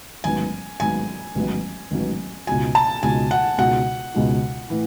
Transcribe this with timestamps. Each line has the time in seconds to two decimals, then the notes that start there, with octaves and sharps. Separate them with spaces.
0.24 A1 G#2 D#3 F#3 B3 G#5
0.80 A1 G#2 D#3 F#3 B3 G#5
1.35 A1 G#2 D#3 F#3 B3
1.91 A1 G#2 D#3 F#3 B3
2.47 C#2 B2 G#3 D#4 F#4 G#5
2.75 A5
3.02 C#2 B2 G#3 D#4 F#4 G#5
3.31 F#5
3.58 C#2 B2 G#3 D#4 F#4 F#5
4.14 C#2 B2 G#3 D#4 F#4
4.70 A2 E3